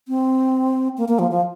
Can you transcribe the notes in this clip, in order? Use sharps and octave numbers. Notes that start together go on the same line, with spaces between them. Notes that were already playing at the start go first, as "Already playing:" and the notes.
C4
A#3
A#3
F3
F3